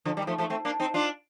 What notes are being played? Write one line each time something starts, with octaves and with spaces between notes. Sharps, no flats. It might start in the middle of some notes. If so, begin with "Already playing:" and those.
D3 F3
D#3 G3
F3 A3
F3 A3
A3 C4
A#3 D4
C4 D#4
D4 F4